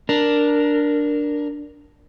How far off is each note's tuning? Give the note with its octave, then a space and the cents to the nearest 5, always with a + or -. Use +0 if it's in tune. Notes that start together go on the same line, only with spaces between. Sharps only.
D4 +0 A#4 +5